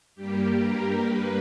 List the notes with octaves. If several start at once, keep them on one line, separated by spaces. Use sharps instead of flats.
G2 G3 A#3 G4
A#4
G2 G3 A#3 B4